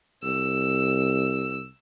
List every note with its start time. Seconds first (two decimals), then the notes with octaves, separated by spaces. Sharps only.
0.23 C2 E6